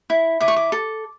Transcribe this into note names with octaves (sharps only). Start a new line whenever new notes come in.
E4
E4 D6
C#6
D6
A4